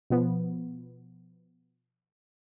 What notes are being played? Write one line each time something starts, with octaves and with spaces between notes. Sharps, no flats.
B2 F3 B3